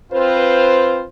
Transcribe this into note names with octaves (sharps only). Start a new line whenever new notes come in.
C4 F4 B4 C5